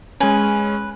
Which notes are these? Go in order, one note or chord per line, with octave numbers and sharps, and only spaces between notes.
G#3 C#4 B4 G#5